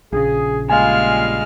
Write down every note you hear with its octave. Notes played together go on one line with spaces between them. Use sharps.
A#1 C#3 G#4
G3 G#3 A#3 F4 F5 G#5 F6